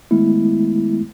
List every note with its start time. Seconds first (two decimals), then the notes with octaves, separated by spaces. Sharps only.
0.11 D#3 G#3 A3 B3 E4